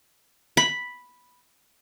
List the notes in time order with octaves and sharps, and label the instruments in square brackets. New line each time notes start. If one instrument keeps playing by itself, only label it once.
[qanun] B5